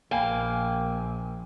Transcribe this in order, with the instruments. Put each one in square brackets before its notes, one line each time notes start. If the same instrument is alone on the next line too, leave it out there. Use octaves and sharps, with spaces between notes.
[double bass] A#1 [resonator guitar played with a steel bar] A#3 [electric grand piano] G5 G#5